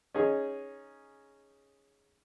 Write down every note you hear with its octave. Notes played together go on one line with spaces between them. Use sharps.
C#4 D#4 G#4